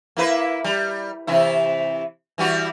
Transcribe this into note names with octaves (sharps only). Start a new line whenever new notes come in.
A#3 E4 B4
G3
C3 E3 E4
E3 G3 F#4